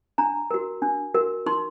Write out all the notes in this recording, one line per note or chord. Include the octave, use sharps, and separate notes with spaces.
D4 A#5
F#4 A#4
D4
F#4 A#4
D#4 C6